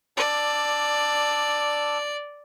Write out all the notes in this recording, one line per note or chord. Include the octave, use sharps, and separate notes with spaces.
D4 D5 D6 E6